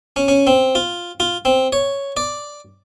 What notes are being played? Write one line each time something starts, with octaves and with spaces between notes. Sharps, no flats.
C#4
C#4
C4
F4
F4
C4
C#5
D5